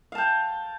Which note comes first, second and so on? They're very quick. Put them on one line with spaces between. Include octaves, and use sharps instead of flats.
F5 A5 G5